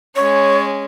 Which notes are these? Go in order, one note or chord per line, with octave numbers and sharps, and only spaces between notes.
G#3 C#4 C#5